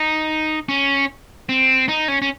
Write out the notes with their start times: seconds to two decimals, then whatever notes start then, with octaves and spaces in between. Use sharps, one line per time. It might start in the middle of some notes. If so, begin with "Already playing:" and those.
Already playing: D#4
0.69 C#4
1.49 C4
1.88 D#4
2.08 C#4
2.22 C#4